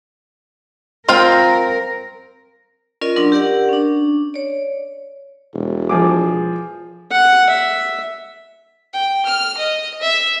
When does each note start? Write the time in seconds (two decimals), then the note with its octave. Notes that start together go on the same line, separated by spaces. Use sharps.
1.09 C4 F4 A#4 F5 G5
3.01 C#4 F4 A#4 D5 D#5
3.16 F#3 D4 A#4 C6 E6
3.32 G4 A#4 D5 F#5
3.69 C#4 D4
4.34 C#5 D5
5.54 E1
5.89 F3 G#4 D6
7.11 F#5
7.49 E5
8.93 G5
9.26 F6
9.57 D#5
10.01 E5